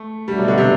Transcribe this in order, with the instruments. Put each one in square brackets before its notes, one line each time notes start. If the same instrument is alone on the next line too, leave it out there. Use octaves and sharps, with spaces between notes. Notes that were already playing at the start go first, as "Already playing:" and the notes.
Already playing: [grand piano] A3
[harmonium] B2 A3 D4 F#4 [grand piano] G3
[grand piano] F#3
D3
C3